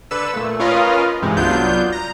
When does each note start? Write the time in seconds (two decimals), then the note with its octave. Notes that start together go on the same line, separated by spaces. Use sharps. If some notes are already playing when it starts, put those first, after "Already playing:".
0.11 D3 A4 B4 E6
0.33 A#2 A3
0.60 C#4 F4 A#4 B4 D#5 F5
1.22 G2 C3 E3 G#3 D#4
1.36 C2 F#3 B3 D4 F4 G6
1.92 A#5